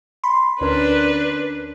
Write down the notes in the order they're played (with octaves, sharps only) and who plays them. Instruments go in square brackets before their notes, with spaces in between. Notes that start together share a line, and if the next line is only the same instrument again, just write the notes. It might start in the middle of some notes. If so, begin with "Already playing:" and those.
[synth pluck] B5 C6
[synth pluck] D2 C#4 A#4 [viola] D4 B4